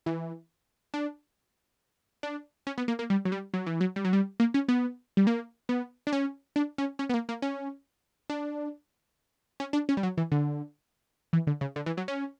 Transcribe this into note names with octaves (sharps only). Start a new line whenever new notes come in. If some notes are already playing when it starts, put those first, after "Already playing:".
E3
D4
D4
C#4
B3
A#3
A#3
G3
F#3
G3
F#3
E3
F#3
G3
F#3
G3
A#3
C#4
B3
G3
A#3
B3
D4
C#4
D4
C#4
C#4
B3
A#3
A#3
C#4
D4
C#4
D4
C#4
G3
F#3
E3
D3
E3
D3
C#3
D3
E3
F#3
C#4